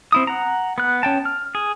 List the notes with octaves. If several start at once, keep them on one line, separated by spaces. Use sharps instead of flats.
C4 E4 D#6
F#5 A#5
B3 F#6
C#4 G5 A5
F6
G#4